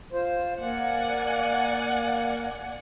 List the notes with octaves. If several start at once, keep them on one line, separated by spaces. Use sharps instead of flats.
F4 C5
A#3 D5 F#5 G#5